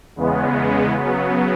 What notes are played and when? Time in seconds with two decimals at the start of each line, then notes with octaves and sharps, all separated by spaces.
0.16 E2 C#3 G#3 B3
0.94 C#3 F#3 B3